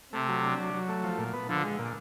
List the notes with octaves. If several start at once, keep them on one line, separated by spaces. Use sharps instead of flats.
C3 A3
F#3
D4
F#3
F#3
A3
F3
A#2
B3
D3 F3
G#3
A#2